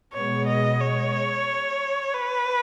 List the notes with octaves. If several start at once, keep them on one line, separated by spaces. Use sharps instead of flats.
B2 G#3 B3 C#5
D#5
C#5
B4